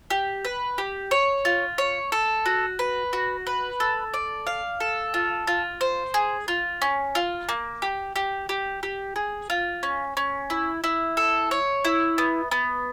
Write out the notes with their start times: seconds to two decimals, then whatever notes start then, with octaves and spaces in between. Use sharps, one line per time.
0.10 G4
0.45 B4
0.78 G4
1.11 C#5
1.45 F4
1.78 C#5
2.12 A4
2.46 F#4
2.79 B4
3.13 F#4
3.47 B4
3.80 A4
4.14 D5
4.47 F5
4.80 A4
5.14 F4
5.47 F4
5.81 C5
6.14 G#4
6.48 F4
6.82 C#4
7.15 F4
7.49 A#3
7.82 G4
8.16 G4
8.49 G4
8.83 G4
9.16 G#4
9.50 F4
9.83 C#4
10.17 C#4
10.50 E4
10.84 E4
11.17 A4
11.51 C#5
11.85 E4
12.18 B3
12.51 B3